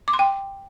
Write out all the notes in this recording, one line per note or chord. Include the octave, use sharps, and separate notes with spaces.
D6
C6
G5